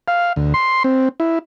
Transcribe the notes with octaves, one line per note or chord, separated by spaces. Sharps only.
F5
D2
C6
C4
E4